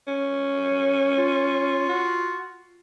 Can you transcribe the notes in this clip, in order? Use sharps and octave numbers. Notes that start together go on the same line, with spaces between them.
C#4
F4
F#4